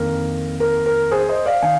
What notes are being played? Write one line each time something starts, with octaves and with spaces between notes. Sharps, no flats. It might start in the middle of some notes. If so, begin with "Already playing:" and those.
Already playing: F2 D#3 A#3 D4 A#4
A#4
A#4
G#4 C5
C5 D#5
D5 F5
D#3 F5 G#5